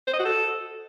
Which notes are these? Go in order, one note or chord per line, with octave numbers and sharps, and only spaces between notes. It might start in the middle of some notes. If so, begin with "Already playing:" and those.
C5
D#5
F#4
A4